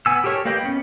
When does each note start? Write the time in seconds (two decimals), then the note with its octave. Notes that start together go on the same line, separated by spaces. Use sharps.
0.06 B3 G#5 E6
0.24 G4 A4 A#4 C#5
0.45 A#3 G4 B4 D#5 G5
0.64 B3 C#4